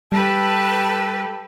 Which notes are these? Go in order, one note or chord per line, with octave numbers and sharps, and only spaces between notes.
G3 G4 A4 B4 A5